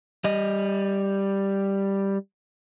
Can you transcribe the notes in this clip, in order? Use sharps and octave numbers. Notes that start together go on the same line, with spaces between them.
G3 D#5